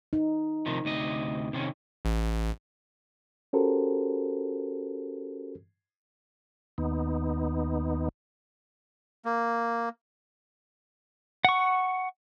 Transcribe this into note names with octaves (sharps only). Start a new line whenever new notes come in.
D#4
C3 D#3 F3
D2 C3 D#5
C3 D#3 C#4
A1
C#4 F#4 G4 A4 A#4 C5
D#2 B3 D#4
A#3
F#5 C#6